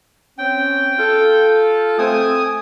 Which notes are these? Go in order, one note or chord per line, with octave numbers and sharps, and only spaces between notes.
C4 C#4 G5
F4 A4
A3 C4 G#5 D#6